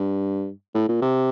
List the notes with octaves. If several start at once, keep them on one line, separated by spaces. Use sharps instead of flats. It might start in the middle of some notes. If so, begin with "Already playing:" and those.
Already playing: G2
A2
A#2
C3